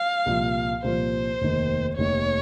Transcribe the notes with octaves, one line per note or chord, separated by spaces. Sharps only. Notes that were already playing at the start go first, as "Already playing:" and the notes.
Already playing: F5
C2 A#2 F3
C2 A#2 F3 C5
F1 D#2 D#3
F1 D#2 D#3 C#5